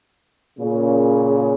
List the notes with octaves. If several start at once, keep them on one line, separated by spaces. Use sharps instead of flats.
A#2 C#3